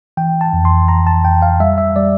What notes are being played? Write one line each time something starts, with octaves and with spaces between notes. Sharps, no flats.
E3 G5
A5
F2
C6
E3 A#5
A5
F2 G5
F5
G3 E5
E5
G3 D5